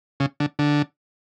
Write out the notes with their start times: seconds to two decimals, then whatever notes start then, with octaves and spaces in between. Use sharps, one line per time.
0.20 C#3
0.40 D3
0.59 D3